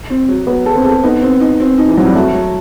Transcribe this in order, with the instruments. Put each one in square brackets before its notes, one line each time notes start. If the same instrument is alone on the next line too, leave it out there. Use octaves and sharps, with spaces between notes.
[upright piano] C4
F#3
[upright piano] F#3 [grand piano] B3
[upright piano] A4
[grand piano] C4
[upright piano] A4
[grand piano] B3 [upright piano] D#4
[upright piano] C4
D#4
C4
D#4
[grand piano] E3
[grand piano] F#3 [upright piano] C4
[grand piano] G3
[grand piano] A3 [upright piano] F#4
[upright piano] F#3